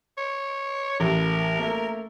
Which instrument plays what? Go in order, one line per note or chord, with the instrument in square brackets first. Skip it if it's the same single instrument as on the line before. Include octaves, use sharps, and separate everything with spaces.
[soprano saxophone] C#5
[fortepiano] A1 [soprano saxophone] A#4
[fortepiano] A3 A#3